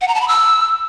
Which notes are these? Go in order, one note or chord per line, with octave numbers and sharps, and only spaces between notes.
F#5
A#5
A5
B5
E6